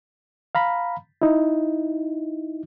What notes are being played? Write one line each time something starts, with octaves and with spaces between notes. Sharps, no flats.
F5 A#5 B5
D#4 E4